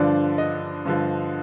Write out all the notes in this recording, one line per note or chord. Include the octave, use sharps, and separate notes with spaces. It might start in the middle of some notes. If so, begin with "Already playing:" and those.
Already playing: G2 D3 F3 D5
D#5
G2 D3 F3